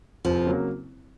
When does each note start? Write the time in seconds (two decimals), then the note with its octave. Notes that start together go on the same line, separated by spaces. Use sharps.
0.25 F1 F3
0.46 C#3 F#3 A#3